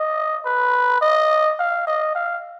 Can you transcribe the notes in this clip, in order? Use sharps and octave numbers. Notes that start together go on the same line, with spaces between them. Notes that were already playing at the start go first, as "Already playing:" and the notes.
Already playing: D#5
B4
D#5
F5
D#5
F5